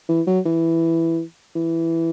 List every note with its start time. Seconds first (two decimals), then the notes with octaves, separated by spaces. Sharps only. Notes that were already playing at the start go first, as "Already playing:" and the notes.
0.09 E3
0.27 F#3
0.45 E3
1.55 E3